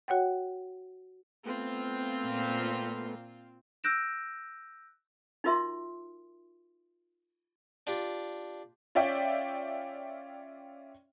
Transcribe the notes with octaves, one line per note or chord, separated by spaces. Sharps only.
F#4 C#5 F#5 G5
A3 B3 C4 F4
A#2
E6 F#6 G6 A#6 D7 E7
D#4 F4 F#4 A#4 E5 C6
D4 F4 G4
C#4 F4 D5 E5 G5